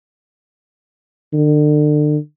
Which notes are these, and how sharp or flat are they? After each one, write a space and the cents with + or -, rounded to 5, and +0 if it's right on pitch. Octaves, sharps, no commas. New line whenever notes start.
D3 +35